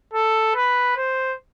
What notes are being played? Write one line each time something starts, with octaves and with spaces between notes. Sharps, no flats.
A4
B4
C5